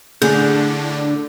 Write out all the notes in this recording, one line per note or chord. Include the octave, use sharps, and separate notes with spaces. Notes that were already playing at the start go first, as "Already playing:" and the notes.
A2 D3 D4 G#4 G6